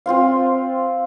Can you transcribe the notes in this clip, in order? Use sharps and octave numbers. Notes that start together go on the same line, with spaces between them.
C4 F4 C5 F5